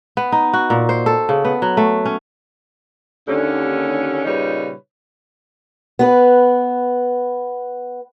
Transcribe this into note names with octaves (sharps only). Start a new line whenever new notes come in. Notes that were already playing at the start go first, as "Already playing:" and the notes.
B3
D#4
F#4
A#2
C5
A4
C#3
B3
F#3
A3
C#4
D#2 D3 C#4
A#2 C#3 G3 D#4 B4 C#5
B3 B4